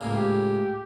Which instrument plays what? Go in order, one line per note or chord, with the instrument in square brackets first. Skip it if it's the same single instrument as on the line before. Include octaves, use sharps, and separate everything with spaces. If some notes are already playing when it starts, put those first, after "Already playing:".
[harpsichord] C#2 A2 C#3 [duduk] A#3
[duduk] G4